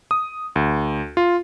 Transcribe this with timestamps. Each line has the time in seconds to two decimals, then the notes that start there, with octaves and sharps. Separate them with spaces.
0.11 D#6
0.56 D2
1.17 F4